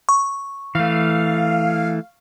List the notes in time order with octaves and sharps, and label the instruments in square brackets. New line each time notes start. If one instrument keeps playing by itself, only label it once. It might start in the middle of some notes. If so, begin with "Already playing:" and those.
[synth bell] C#6
[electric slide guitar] E3 A3 [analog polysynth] F5